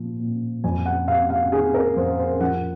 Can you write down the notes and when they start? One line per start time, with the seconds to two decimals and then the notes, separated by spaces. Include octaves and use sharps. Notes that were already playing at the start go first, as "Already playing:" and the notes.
Already playing: A#2 F3
0.19 A#2
0.64 F2 G#5
0.86 F#5
1.08 C3 F5
1.30 F5
1.52 D#3 G#4
1.74 A#4
1.96 F2 C5
2.18 C5
2.40 F3 F#5